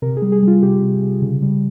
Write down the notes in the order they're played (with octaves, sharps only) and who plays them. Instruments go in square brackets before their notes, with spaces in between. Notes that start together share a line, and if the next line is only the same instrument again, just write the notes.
[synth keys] C3 A#4
G#4
G3
G#4
G3 F4
C3 G4
C3
C3
C#3
G3